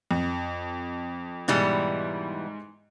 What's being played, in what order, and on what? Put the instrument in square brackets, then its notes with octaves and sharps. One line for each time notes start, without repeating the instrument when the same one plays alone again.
[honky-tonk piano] F2
[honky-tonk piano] G#2 G#4 C#7 [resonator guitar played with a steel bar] B2 E3 G3